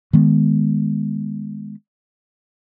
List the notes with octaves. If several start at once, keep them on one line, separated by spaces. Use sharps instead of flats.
D#3 G#3 B3